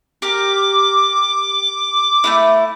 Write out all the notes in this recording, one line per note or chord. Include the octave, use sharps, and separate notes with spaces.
G4 A#4 D6
A3 B3 E4